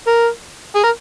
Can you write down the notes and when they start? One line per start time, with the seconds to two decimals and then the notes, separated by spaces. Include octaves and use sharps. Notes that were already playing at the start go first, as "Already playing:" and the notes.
0.07 A#4
0.75 G#4
0.83 A#4